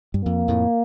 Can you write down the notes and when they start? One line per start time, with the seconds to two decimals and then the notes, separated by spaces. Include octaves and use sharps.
0.14 G2
0.25 F2 A#3
0.48 F2 A2